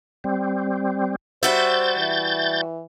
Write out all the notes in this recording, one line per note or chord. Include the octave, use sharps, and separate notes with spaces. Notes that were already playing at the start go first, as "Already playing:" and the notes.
G3 C4
G3 F#4 C5 E5 G6 A6
E3